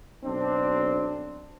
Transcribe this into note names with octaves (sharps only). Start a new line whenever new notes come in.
B1 C4 D4